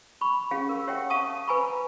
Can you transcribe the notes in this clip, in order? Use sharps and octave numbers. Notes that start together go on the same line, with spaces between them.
B5 C#6
C#4 G4 G#4 F5
A#4
G4 C#5 E5 F#5 G5
F5 A5 C#6 D#6
B4 G#5 A#5 B5 C#6